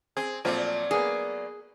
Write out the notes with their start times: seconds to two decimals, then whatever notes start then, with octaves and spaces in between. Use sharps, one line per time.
0.17 C4 G#4
0.45 A#2 F3 F#3 A3 C4 D5
0.91 A#3 B3 G#4